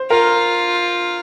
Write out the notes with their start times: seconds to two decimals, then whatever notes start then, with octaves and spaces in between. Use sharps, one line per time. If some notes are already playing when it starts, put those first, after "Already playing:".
Already playing: C5
0.10 F4 A#4